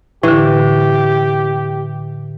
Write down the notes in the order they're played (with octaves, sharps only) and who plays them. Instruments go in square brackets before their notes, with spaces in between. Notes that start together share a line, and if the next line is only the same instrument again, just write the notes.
[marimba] A2 D3 [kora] E3 [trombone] G4